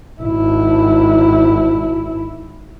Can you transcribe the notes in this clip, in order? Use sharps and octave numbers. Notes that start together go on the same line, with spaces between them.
G#1 E4